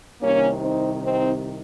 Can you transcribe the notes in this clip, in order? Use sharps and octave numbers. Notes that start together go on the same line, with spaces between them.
C2 C3 D#3 A#3 C#4
C4 D#4
C4 D#4